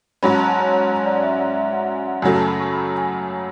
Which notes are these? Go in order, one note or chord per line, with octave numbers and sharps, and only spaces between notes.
G#2 F#3 C#4 B5
A5
G#5
A5
C#5
C#5
C#5
D5
D5
E5
D5
E5
F#5
G#5
F#5
F#2 C#3 F#3 A3 G#5
A5
B5
C#6
B5
G#5